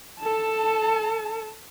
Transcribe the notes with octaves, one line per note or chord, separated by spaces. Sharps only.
A4 A5